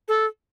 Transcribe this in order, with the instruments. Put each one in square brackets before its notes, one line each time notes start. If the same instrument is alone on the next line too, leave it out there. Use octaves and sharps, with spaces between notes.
[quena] A4